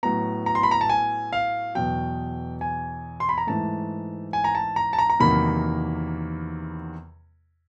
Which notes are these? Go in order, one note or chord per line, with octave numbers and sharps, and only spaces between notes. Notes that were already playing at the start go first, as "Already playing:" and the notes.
A2 F#3 B3 A#5
A#5
C6
B5
A#5
A5
G#5
F5
E2 B2 F#3 G5
G#5
C6
B5
A#5
G#2 E3 A3 A5
G#5
A#5
A5
A#5
A5
A#5
A#5
E2 C3 D#3 F#3 A#3 B5